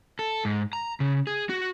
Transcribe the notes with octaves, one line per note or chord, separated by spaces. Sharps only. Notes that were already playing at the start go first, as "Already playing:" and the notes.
A4
G#2
A#5
C#3
G#4
F#4